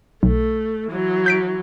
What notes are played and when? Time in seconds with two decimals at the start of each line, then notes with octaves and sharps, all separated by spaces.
0.23 B1 A3
0.87 E3 F#3
1.26 G6 B6 D7